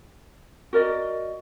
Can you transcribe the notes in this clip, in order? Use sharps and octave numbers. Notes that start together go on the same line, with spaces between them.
F#4 A#4 D5 D#5